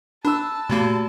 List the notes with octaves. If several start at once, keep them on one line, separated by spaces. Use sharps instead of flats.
D4 B4 A5 E6
A#2 A3 A#3 F#4 G4